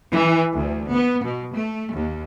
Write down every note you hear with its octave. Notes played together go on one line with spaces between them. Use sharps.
E3
D2
B3
B2
A3
D#2